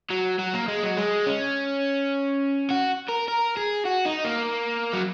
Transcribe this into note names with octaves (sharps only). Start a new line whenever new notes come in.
F#3
F#3
A#3
G#3
F#3
G#3
C#4
F#4
A#4
A#4
G#4
F#4
D#4
A#3
F#3